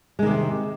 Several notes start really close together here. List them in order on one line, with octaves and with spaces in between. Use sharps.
G#3 D#3 C3